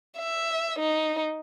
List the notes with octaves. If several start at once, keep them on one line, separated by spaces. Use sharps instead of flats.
E5
D#4